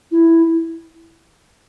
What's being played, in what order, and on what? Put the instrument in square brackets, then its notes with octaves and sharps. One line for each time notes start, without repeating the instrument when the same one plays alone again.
[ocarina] E4